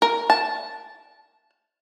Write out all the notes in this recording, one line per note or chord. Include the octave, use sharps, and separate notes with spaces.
A#4
A5